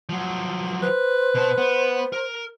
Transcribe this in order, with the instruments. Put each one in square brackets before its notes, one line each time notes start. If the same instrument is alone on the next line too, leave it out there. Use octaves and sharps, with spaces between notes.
[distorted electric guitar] F3 F#3
[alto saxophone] B4 [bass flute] C5
[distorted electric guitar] B2 A5
B3
A#4